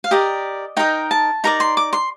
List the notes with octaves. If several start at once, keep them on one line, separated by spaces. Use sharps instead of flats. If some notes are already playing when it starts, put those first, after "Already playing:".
F5
G4 A#4 D5 D#5
D#4 A#4 D#5 G5
A5
D#4 A#4 D5 A#5
C6
D6
C6